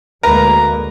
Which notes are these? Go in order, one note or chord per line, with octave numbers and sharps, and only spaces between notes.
D2 G#3 A#3 A#4 B4 A#5